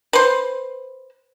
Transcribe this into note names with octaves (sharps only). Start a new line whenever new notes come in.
B4 C5